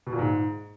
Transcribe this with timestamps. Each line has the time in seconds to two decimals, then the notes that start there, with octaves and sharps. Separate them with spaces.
0.07 B2
0.13 A#2
0.19 G#2